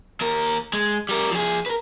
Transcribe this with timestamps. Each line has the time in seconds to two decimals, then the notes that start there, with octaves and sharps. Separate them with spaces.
0.21 D#2 A#4
0.73 G#3
1.09 G3 A#4
1.31 F3 G#4
1.66 A#4 B4